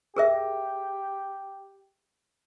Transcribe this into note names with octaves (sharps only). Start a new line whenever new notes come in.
G4 G#4 A#4 E5